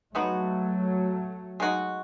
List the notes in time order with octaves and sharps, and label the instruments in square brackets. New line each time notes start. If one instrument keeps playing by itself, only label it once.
[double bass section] F#3 A3 [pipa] G#3 B3 D#4 F#4
[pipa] G#3 D#4 F#4